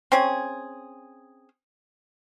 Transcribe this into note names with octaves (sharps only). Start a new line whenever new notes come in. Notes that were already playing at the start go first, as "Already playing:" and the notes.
C4 C#4 G#4